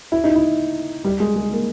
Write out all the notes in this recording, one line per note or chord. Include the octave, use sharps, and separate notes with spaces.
E4
D#4
E4
G3
G#3
G#3
A#3